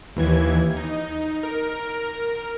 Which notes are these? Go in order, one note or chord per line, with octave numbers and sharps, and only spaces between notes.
D#2 E3 G#6
D#4
A#4